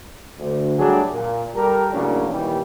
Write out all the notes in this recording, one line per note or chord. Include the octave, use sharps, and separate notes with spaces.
D2
F#3 G3 A3 D4 F#4 G#4
A#2
G3 G4 A4 A#4
A2 C#3 F#3 A#3 C#4 D4
D#2 A#2 E3 G3 G4